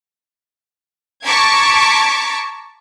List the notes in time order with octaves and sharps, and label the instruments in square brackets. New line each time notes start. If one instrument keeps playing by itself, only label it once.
[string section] A5 A#5 C#6 D6 G#6 B6